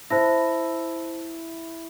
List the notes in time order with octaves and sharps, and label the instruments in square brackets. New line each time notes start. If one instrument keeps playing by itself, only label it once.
[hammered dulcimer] E4 [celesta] C5 A5 A#6